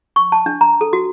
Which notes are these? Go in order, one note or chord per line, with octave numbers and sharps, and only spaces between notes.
C#6
A5
D4
A#5
A4
F#4